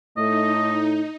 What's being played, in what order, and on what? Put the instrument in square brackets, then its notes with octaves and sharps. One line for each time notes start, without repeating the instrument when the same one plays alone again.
[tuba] A2 [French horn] A3 [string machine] D#4 [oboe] D#5